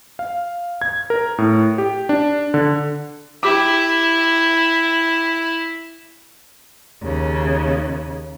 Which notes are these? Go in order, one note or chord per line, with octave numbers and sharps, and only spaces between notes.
F5
G#6
A#4
A2
G4
D4
D3
E4 G4 D6
D#2 C#3